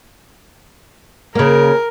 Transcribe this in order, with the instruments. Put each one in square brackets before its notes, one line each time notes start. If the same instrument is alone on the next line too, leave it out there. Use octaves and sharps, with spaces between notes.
[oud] C#3 A#3 [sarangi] A#4